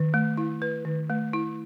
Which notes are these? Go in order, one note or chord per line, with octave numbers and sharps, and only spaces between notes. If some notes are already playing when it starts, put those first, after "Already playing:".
Already playing: D#3
A3
E4
B4
D#3
A3
E4